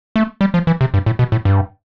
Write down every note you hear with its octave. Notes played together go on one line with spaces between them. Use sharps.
A3
G3
F3
E3
C3
G2
A2
B2
A2
G2